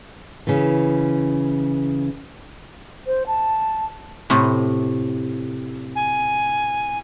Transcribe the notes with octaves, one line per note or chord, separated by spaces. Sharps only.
C#3 E3
C5
A5
A2 C3
G#5